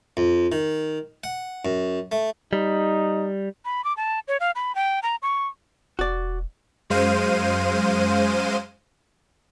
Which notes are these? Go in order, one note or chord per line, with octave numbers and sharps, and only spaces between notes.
F2
D#3
F#5
F#2
A3
G3 D#4
B5
D6
A5
C#5
F5
B5
G5
A#5
C#6
E1 F#4 D5
F#2 G#3 C5 F5 D#7